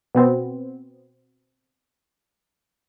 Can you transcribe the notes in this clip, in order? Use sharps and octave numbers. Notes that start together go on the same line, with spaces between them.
B2 B3 C4